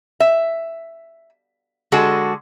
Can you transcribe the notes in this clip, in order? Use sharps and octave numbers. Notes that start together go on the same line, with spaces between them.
E5
D3 G#3 F#4 G#4 A4